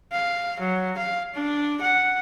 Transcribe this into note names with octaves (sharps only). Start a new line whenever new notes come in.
F5
F#3
F5
D4
F#5